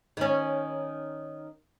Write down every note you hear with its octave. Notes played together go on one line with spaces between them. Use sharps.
D#3 C#4